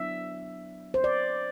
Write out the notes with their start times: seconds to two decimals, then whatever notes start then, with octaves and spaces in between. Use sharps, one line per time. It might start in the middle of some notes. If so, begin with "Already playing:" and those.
Already playing: F#3 B3 D4 E5
0.94 C5
1.04 D5